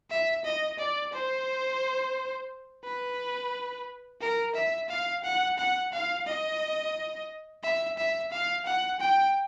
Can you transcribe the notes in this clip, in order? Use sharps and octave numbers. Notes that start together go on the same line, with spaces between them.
E5
D#5
D5
C5
B4
A#4
E5
F5
F#5
F#5
F5
D#5
E5
E5
F5
F#5
G5